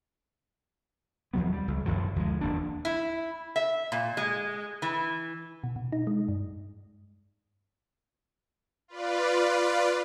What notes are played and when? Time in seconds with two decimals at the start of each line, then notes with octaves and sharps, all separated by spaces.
1.33 D#2 F3 F#3 B3
1.53 G3
1.68 C#2
1.86 A1 F#2 D#3 F3
2.16 D2 F3 G#3
2.41 D#1 E2 A#3 D4
2.85 E4
3.56 E5
3.92 A#2
4.17 G#3
4.82 E3
5.64 B2
5.76 B2
5.92 D#4
6.07 G#3
6.28 G2
8.88 F4 B4 D5